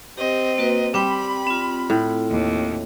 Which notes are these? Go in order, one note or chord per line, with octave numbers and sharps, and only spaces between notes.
C4 G4 D#5
A#3 F#4 B4
G3 C4 G5 B5
C4 F4
A2
D#2